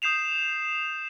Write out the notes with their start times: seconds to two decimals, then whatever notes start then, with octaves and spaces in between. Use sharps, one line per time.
0.02 D#6 G6 C7 E7 F7